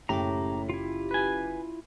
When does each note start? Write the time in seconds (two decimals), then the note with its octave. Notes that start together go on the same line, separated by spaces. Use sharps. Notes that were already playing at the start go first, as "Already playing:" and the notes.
0.09 F#1 A2 C#4 G4 A#5 D6
0.69 E4 F4
1.11 B4 G#5